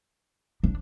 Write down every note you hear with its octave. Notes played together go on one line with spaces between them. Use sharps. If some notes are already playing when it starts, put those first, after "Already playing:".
D4